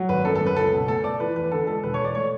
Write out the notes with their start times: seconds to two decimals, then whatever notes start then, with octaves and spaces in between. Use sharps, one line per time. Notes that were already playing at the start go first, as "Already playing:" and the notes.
Already playing: F#3
0.09 G#1 B4
0.25 F#2 A4
0.35 A4
0.41 F#2
0.46 B4
0.56 C#2 A4
0.72 B2
0.88 A3 A4
1.04 A3 D5
1.20 E3 B4
1.36 E2 B4
1.51 D3 A4
1.67 G#3 A4
1.83 E1 B4
1.94 C#5
1.99 E1 D5
2.15 A3 C#5